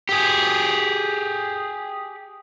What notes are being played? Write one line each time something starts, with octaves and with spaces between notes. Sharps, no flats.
G4 G#4